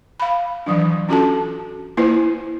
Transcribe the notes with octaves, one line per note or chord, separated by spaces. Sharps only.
F5 B5
D#3 E3 F#3 D4
C#4 D4 F4 F#4 A4 A5
A#3 E4 F4 B4 C5